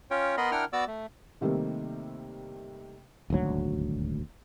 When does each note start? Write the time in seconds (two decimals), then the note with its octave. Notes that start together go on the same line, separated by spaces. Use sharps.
0.10 C#4 F4 C#5 G5
0.37 B3 A#4 D#5 B5 C6
0.51 D4 E4 A#4 F#5 G5 F6
0.73 B3 F#4 D5 D6 E6
0.87 A3
1.41 C3 D#3 G3 A3 A#3 C4
3.30 D#1 G#1 D2 F#3